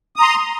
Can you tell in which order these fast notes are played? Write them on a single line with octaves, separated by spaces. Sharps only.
D#6 A#5 C6